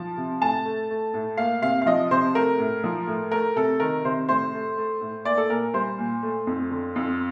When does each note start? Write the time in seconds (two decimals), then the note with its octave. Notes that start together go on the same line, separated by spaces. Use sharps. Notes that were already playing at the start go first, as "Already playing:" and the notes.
Already playing: F3 A5
0.17 C3
0.41 A2 A5
0.65 A3
0.90 A3
1.14 A2
1.37 A#3 F5
1.62 C3 F5
1.82 F5
1.86 F3 D#5
2.11 C3 C5
2.35 A3 A#4
2.59 A2
2.84 F3
3.07 A2
3.31 A3 A#4
3.56 C3 A4
3.80 D#3 A#4
4.04 C3 C5
4.29 A2 C5
4.53 A3
4.77 A3
5.01 A2
5.25 A#3 D5
5.37 A4
5.49 A#2 A#4
5.74 G3 C5
5.98 A#2
6.22 A3
6.47 F2
6.70 D3
6.96 F2